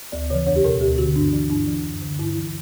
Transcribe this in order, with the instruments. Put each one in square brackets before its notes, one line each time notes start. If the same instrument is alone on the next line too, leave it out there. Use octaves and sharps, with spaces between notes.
[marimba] D2 D5
C#3 E3 C#5
E2 C#5
G4
B2 A#4
D2 G4
D3 F#4
G2 D4
E3
G2 D4
E3
F#2
D3
G2 E4
E3